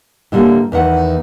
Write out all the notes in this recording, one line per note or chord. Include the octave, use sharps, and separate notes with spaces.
A2 D3 G3 A#3
E2 D#3 F#5